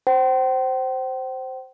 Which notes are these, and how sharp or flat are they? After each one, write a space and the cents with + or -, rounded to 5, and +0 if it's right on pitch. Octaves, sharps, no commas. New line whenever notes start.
C5 +0 G5 -40